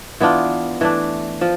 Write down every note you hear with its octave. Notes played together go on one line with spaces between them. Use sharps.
E3 B3 D4 F4
E3 A3 D4
F3